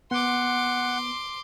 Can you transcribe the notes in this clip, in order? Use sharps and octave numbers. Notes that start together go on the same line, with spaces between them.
B3 F#5 C6 D6